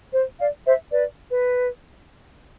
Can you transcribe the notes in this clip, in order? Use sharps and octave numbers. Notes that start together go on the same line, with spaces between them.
C5
D5 F5
C5 E5
B4 D5
B4